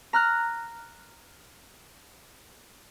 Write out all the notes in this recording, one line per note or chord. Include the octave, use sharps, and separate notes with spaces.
A#5 F6 F#6